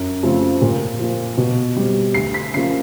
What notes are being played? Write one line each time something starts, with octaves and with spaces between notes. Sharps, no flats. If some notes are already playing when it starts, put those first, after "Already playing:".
Already playing: F#2
C#3 F3 A3 C4
A#2
F3 A#3
B2
G3 C4
D2 C7
B6
C#3 F3 A#3 C7